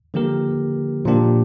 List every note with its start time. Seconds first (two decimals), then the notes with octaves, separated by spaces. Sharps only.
0.14 D3 F3 A#3 G4 A#4
1.05 A#2 F3 A#3 D4 G4